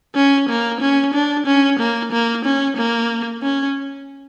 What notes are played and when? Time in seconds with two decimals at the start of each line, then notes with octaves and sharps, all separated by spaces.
0.15 C#4
0.49 A#3
0.81 C#4
1.14 D4
1.47 C#4
1.80 A#3
2.12 A#3
2.45 C#4
2.77 A#3
3.43 C#4